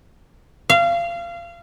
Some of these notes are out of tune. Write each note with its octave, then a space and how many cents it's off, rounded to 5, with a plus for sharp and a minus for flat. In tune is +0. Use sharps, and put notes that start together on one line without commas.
F5 -25